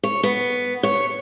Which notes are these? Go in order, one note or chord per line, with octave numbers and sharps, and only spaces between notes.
C#5
B3
C#5